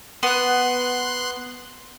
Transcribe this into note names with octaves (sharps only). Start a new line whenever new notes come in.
B3 C6 F#6